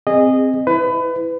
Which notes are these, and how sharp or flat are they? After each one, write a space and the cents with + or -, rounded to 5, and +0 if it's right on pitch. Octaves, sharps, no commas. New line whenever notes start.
C4 +0 G#4 -15 D#5 -15
E4 +0 B4 +30